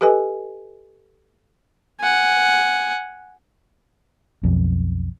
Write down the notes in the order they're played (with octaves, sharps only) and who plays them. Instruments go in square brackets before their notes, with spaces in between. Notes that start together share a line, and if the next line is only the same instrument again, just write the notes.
[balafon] G4 A4 B4 D#5 G#5
[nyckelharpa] F#5 G#5
[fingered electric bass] B1 F2